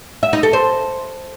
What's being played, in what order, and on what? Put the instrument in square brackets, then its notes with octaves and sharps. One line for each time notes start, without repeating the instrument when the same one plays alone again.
[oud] E5
D#4
A4
C5